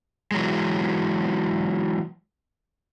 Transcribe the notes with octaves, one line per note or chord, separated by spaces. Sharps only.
E3 F#3 G#3